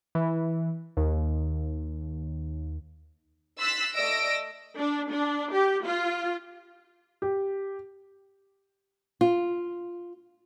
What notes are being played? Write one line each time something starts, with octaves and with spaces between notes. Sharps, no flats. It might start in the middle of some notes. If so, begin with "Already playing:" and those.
E3
D#2
C6 E6 F#6 A6 B6
A3 D5 D#5 E6 A#6 D7
D4
D4
G4
F4
G4
F4